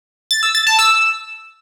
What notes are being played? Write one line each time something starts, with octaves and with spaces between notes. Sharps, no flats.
A6
E6
A6
A5
E6